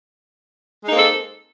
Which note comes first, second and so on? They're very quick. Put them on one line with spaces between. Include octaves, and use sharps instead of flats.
G#3 D#4 A#3 C4 A4